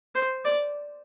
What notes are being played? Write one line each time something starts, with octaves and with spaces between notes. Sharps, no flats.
C5
D5